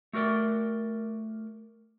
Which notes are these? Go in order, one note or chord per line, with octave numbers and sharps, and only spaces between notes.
A3 F#4 A#4 D5 G5